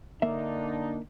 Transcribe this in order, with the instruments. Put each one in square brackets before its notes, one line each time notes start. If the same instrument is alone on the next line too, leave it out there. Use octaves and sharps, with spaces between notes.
[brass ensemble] D3 D4 D#4 [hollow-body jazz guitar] A#3 E5